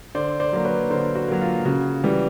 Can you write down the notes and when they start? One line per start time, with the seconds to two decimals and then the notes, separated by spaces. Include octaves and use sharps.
0.15 D3 C5 D5
0.40 C5 D5
0.53 F#3 A#3
0.65 B4 C#5
0.90 D3 A#4 C5
1.15 F#4
1.28 F#3 A#3
1.41 F4
1.65 C#3 F#4
2.04 E3 G3